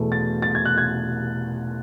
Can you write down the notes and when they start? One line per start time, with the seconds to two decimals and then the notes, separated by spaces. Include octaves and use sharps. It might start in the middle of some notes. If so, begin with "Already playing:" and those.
Already playing: E2 B2 A3 E4
0.12 A6
0.42 A6
0.55 G#6
0.65 F#6
0.78 G#6